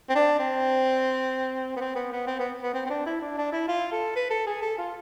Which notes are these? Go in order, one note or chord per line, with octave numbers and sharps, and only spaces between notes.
C4
D4
C4
B3
C4
B3
B3
C4
B3
B3
C4
C4
D4
E4
D4
D4
E4
F4
A4
B4
A4
G#4
A4
F4